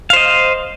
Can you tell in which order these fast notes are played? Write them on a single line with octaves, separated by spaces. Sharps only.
F5 C5 D#5